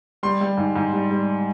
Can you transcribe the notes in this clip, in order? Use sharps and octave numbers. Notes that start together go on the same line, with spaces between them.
G3 C6
G3
G#2
G#2
G3
G3